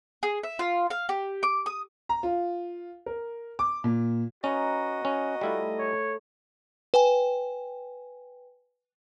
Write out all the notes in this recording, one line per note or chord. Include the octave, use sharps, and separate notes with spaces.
G#4
E5
F4
F5
G4
D6
D#6
A#5
F4
A#4
D6
A#2
C#4 D#4 F#4 B4 D#5
C#4 B5
G3 A3 E4 F4
C#5
B4 G5 G#5